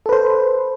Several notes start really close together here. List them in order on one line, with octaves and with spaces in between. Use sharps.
A4 B4 C5